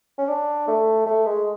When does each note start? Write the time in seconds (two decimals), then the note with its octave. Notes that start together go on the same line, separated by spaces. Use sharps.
0.18 C#4
0.28 D4
0.68 A3
1.06 A3
1.26 G#3